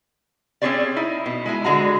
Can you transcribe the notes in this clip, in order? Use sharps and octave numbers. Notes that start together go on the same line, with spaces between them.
C4 C#4 G4 G#4 C#5 D5
D#4 E4
B2
G#3 E4 G#5
D3 G#3 F#4 A#5